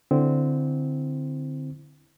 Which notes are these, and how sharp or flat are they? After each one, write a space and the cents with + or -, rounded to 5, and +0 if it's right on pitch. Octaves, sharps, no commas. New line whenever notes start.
D3 +0 C4 -10 E4 +0